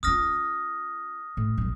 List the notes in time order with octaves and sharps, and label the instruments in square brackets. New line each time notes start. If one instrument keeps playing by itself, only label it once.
[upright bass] C#4 F4 [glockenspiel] D#6 F6 A#6
[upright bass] A2
B1 G3